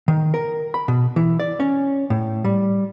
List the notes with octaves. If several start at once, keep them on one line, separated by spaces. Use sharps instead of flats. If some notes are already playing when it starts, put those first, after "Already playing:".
D#3
A#4
B5
B2
E3
D5
C#4
A2
G3